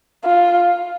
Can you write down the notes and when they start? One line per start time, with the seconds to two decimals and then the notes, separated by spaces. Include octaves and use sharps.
0.25 F4